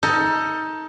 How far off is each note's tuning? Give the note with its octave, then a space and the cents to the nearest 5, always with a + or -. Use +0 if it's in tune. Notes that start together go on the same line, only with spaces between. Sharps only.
D#4 +20 A4 +25